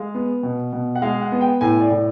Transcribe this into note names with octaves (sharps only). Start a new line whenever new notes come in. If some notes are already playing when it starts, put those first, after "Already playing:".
Already playing: G#3 F5
B3
B2
B2
F#5
G#3 F5
F#5
B3
G5
A2 G#5
D5
A2